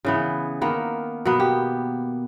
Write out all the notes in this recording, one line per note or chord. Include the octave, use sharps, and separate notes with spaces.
C#3 E3 B3
D#3 A#3 B3
B2 A#3 B3
G4